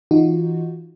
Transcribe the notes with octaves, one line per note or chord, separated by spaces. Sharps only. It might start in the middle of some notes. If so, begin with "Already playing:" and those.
E3 D#4 F4 F#4